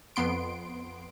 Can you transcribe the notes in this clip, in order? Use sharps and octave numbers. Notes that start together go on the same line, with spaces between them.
F2 B3 C6 D7